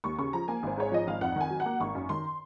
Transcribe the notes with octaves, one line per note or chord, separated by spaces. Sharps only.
D#2 C#6
C#3 C#6
F3 A#5
A#3 G#5
G#1 C5
G#2 C#5
F3 D#5
G#1 F5
F2 F#5
D#3 G#5
F#3
F#5
A#3
G#1 C#6
F#2
D#3 C6